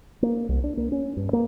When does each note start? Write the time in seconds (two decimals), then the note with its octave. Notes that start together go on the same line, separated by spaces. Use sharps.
0.23 A#3
0.49 C2
0.64 D4
0.77 A#3
0.92 C#4
1.17 G2
1.33 A#3